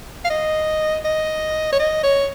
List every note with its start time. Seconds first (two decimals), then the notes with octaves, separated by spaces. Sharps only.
0.25 F5
0.30 D#5
1.05 D#5
1.72 C#5
1.79 D#5
2.04 C#5